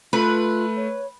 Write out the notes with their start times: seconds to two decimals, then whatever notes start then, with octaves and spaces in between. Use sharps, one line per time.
0.13 A3 F4 B4
0.76 C#5